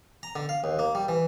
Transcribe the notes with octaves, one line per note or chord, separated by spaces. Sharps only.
A#5
D3
F5
D#2
A#3
G3
E3